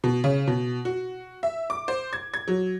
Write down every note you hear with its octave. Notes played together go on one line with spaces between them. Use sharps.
B2
C#3
B2
F#4
E5
D6
C5
G#6
G#6
F#3